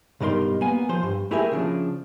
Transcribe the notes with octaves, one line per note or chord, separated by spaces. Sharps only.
B1 G2 G3 D#4 A#4 C6
A#3 B3 G#5
F3 C5
G2
A3 E4 G4 G#4 A#4 E5
C#3 F3 D4